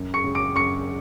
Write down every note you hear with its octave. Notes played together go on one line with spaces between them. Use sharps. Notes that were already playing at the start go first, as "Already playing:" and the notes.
Already playing: F#2
C#6 C#7
C#3 G#3
D6 D7
F#2 C#6 C#7